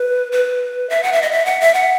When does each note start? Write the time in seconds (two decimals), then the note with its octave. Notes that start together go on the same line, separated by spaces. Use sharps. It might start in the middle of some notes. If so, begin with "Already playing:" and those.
Already playing: B4
0.32 B4
0.90 E5
1.03 F#5
1.13 E5
1.22 D#5
1.31 E5
1.46 F#5
1.61 E5
1.74 F#5